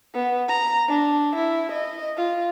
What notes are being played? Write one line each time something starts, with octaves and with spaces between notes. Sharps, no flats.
B3
A#5
D4
E4
D#5
F4